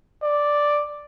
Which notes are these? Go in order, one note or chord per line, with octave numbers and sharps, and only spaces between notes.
D5